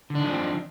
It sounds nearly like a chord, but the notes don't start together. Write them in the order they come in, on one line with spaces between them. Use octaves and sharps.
D3 D4 D#3 F3 C4